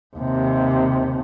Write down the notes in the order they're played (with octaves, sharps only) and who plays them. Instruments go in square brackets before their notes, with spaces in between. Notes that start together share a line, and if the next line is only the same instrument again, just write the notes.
[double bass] D#2 C3